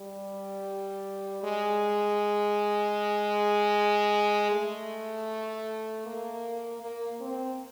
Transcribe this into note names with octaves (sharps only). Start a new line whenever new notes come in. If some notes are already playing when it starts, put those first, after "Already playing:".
Already playing: G3
G#3
A3
A#3
A#3
C4